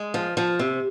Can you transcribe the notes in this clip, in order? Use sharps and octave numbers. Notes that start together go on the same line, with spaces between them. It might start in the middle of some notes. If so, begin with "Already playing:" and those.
Already playing: G#3
F3
F3
C3